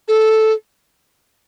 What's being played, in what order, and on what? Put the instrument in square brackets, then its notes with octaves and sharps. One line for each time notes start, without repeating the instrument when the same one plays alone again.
[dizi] A4